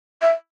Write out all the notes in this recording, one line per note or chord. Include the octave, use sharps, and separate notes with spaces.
E5